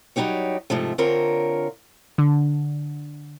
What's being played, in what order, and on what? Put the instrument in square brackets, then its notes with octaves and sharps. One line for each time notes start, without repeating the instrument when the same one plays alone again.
[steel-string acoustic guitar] F#3 G3 D#4 G4 C#5
G#2 C3 F3 A3
D3 C4 F4 A#4 C#5
[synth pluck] D3